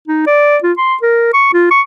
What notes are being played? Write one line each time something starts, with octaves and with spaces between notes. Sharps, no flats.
D#4
D5
F4
C6
A#4
C#6
F4
C#6